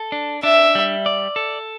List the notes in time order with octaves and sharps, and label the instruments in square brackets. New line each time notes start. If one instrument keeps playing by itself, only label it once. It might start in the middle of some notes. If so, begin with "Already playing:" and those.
Already playing: [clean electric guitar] A4
D4
[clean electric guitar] D4 [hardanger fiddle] E5
[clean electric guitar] G3
D5
A4